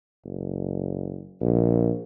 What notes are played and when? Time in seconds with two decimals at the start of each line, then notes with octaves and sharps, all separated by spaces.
0.25 F#1
1.41 A#1